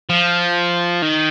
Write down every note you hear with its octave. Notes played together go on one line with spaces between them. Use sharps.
F3
D#3